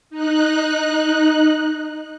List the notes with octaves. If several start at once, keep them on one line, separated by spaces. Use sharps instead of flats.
D#4 F#6